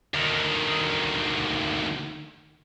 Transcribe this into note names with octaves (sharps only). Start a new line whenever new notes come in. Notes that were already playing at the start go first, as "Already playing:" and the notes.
D2 D#3